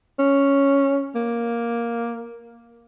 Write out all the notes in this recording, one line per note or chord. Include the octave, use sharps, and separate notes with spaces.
C#4
A#3